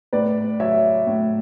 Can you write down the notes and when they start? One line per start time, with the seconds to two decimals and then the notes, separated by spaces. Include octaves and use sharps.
0.13 A2 B4 D5
0.60 F#3 C#5 E5
1.07 A2